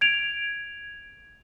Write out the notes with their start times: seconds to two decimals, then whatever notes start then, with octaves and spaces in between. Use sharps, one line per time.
0.01 G#6 D7 F7